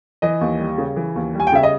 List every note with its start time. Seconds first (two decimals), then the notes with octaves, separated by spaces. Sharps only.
0.22 E3 D#5
0.41 D#2
0.59 G3
0.78 C#3
0.96 E3
1.16 D#2
1.34 G3
1.40 G#5
1.47 G5
1.53 C#3 E5
1.63 D#5